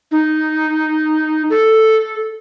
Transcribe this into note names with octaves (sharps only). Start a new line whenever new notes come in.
D#4
A4